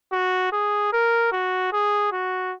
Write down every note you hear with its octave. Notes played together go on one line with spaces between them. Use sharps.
F#4
G#4
A#4
F#4
G#4
F#4